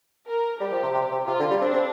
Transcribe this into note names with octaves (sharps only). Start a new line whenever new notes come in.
A#4
G3 G4
F3
C3
C3
C3
C3 F4
D3
G3
C4 D4
C4